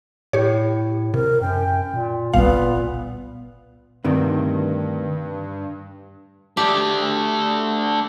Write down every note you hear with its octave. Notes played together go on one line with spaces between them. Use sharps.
A2 G4 C#5
C3 A#4
F#2 G5
A#2
G1 C2 A#2 B3 F5
D2 G2 C3 D#3
A3 D4 G4